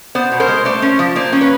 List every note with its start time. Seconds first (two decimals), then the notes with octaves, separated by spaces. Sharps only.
0.15 B3 C5 D5
0.32 B2
0.40 A#4 C5
0.48 G#3
0.65 A3 C5 D5
0.82 C#4
0.99 F3
1.16 A#3 C5 D5
1.33 C#4
1.41 B4 C#5